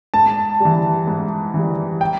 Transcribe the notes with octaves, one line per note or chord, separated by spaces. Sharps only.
G#2 A5
E3 G3
G#2
E3 G3
G5